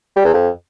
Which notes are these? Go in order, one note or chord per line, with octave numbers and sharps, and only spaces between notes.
G3
E2
F2